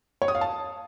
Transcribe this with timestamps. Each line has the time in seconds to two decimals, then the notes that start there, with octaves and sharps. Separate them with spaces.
0.22 C#5
0.28 D#6
0.35 F5
0.41 A5